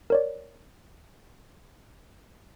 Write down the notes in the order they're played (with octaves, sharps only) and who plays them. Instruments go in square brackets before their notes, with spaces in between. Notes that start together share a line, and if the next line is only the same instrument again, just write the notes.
[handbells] A#4 C#5 D5